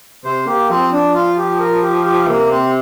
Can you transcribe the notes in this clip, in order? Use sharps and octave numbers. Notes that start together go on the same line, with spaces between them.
C3 C5
A#3 G4
F3 C4
D4
F4
G4
A#4
G4
G4
C3 A#3
C4